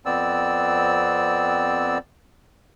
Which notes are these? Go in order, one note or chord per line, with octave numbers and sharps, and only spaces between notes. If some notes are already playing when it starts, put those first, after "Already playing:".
F2 B3 C4 D5 E6